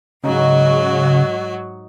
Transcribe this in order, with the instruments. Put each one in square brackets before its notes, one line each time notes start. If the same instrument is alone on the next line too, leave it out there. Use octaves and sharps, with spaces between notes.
[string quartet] G#2 F#3 F#4 [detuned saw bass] C#3 [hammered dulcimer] D#4